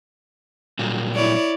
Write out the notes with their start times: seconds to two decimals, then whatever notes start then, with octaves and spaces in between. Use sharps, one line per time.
0.79 A#2 F#3 G3
1.15 E4 C#5 D5